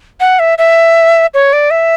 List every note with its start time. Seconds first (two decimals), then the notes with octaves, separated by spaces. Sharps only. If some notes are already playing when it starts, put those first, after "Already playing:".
0.20 F#5
0.39 E5
0.58 E5
1.34 C#5
1.53 D5
1.71 E5